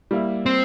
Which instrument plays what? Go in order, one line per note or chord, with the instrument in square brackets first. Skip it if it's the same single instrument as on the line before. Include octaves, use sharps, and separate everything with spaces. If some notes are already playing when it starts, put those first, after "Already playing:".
[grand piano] G3 A#3 E4
[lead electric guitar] C4